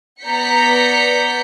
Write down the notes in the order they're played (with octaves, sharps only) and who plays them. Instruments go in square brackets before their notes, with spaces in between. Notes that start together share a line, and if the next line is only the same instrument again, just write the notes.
[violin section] B3 D5 A#5 G6 B6 C#7